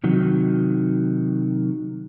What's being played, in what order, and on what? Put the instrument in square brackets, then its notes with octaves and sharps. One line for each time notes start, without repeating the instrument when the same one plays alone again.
[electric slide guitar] C3 D#3 F#3